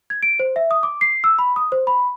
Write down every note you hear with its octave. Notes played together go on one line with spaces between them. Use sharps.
G#6
D7
C5
E5
D#6
D6
C7
E6
B5
D#6
C5
B5